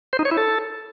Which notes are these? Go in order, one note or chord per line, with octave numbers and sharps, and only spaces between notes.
C5
D#4
C#5
E4
A4